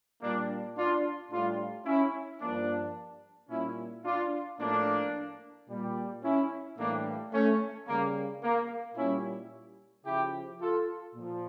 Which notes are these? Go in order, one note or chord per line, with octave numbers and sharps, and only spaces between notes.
A#2 G3 A#3 D4
D4 F4
A2 G3 D4 F4
C#4 E4
G2 F3 A#3 D4
A#2 G3 C#4 E4
D4 F4
A2 F3 A#3 D4
A#2 G3
C#4 E4
A2 E3 G3 A#3 D4
A3 C#4
C#3 G3 A#3
A#3
A#2 G3 C#4 E4
C#3 F3 E4 G4
F4 A4
A#2 F3